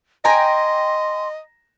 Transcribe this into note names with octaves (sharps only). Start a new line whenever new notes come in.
D#5 G5 G#5 A#5 C6 A#6